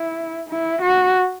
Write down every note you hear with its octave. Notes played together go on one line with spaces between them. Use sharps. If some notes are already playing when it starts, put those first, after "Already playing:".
Already playing: E4
E4
F#4